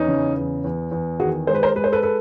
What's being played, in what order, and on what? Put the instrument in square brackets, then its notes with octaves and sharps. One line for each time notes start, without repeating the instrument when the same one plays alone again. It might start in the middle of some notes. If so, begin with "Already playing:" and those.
Already playing: [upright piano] E2 C#4 D#4
C#3
E2
E2
E2
D#3 F#4 G#4
G#3 C5
B4
A#4 C5
G#3 B4
C5
A4 B4
A4 B4